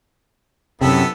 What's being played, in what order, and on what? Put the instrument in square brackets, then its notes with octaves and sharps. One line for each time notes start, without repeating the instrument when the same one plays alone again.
[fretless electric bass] F#2 C3 [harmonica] B3 E4 A4